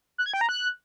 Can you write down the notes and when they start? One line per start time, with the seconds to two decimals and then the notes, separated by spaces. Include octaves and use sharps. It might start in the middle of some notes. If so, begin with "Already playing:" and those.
0.18 F#6
0.26 G#6
0.34 G5
0.41 A#5
0.49 F#6